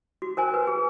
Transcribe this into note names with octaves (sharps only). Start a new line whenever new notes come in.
F#4
A#4 C5 G#5
B4
G#4